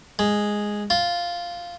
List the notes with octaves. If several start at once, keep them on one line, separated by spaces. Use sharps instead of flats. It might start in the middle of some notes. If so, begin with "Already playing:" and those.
G#3
F4